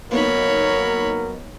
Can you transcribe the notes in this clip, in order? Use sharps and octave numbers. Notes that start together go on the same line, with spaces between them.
F#3 A#3 B3 D#4 A#4 C#5 B5